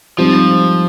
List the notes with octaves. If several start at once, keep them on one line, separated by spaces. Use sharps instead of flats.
G#2 F3 G3 C4 F4